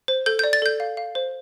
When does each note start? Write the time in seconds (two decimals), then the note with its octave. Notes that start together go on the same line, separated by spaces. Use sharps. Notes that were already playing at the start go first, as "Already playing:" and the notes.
0.08 C5
0.26 A4 G6
0.39 D5 G6
0.53 A6
0.62 A4 G6
0.80 F5
0.97 F5
1.15 C5